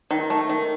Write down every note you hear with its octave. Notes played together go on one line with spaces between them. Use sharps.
D#3
A3
D#3